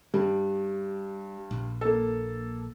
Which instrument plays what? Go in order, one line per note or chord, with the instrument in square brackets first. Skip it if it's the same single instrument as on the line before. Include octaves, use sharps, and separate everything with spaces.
[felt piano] G2 [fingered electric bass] G3
[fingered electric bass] A#1
[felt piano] A#3 A4